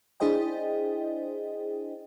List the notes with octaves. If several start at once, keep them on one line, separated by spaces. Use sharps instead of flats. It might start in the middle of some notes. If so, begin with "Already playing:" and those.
D4 E4 G#4 C5 D#5 G5